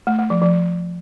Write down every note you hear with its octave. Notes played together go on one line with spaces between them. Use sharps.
A3
A3
F3
F3